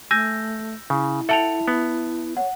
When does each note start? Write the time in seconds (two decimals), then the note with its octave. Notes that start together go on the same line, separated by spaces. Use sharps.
0.11 A3 G#5 E6 G6 A#6
0.90 C#3 E4
1.29 A4 E5 F#5 G5 A5 F7
1.68 B3
2.37 C#5 F#5